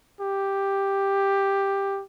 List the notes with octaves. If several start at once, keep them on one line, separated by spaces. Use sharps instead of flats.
G4